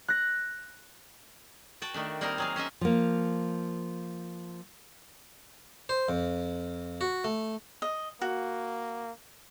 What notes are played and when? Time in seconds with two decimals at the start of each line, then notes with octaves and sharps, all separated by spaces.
0.08 F#6 A#6
1.82 F#4 G5 A5
1.94 D#3 A3 D4
2.21 G3 A#3 C4 D#4 A#4
2.38 F#3 G#4 F5
2.56 C#4 C5 D#5 E5
2.81 F3 A#3
5.89 C5
6.09 F2
7.01 F#4
7.24 A3
7.82 D#5
8.21 A#3 F#4